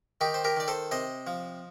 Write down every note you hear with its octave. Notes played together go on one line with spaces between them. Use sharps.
D#3 D#4 G4
C5
G4 A#4
D#3 D5
A4 C5
C3 C5 D#5
F3